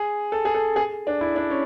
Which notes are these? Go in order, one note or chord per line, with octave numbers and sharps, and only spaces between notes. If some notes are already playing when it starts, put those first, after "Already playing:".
Already playing: G#4
A4
G#4
A4
G#4
D4
E4
D4
C#4